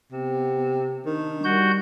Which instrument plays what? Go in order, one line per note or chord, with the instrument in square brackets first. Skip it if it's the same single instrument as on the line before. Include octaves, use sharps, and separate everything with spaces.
[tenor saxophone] C3 [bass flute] B3
[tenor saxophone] D#3 [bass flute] D4
[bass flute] G3 [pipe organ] F#4 G6